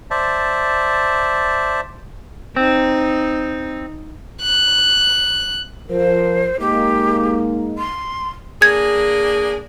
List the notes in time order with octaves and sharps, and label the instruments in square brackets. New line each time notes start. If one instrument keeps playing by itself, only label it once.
[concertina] C5 D5 E5 A5
[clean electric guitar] C4 [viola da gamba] D#4
[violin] F#6
[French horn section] F3 A#4 [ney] C5
[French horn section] G#3 A#3 D#4 [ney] G4
[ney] C6
[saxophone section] A#3 D4 G#4 [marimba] G#6